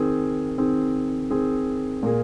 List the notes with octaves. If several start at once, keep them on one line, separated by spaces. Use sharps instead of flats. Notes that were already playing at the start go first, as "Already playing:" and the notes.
Already playing: D#3 C4 G#4
D#3 C4 G#4
D#3 C4 G#4
A#2 A#3 G#4